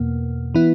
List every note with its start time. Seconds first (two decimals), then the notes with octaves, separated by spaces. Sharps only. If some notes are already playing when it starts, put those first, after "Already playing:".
Already playing: E2 B2 A#3
0.54 E3 B3 E4